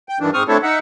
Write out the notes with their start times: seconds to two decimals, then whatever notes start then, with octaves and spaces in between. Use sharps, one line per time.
0.09 G5
0.20 G2 D#3 E3 D4
0.34 G#2 C4 C#6 D#6 F6
0.48 A3 C4 D4 E4 A4 C#5
0.63 D#4 E5 F#5